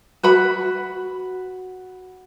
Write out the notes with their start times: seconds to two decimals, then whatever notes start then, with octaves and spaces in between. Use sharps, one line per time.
0.23 F#4 B4 B5